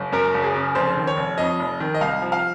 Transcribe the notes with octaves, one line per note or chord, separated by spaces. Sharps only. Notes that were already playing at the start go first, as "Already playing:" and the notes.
Already playing: F#1
F#2 A#4
F#1
G#4
C#3
F1 C5
D#3
C#5
F1
F2 D#5
F1
D#3
D#5
C2 F5
F3
F5